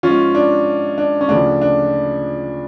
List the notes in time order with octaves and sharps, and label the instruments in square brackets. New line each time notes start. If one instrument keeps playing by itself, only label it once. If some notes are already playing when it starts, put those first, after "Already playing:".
[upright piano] G#2 F3 C#4 F4
D4
D4
C#4
D2 C#3 F3 D4
D4